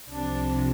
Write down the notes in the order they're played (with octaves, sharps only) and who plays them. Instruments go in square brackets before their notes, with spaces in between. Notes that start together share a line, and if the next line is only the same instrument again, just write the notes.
[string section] C2 C3 F3 D4